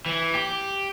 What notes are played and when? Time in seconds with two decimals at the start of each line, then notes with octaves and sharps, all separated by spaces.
0.06 E3
0.33 G4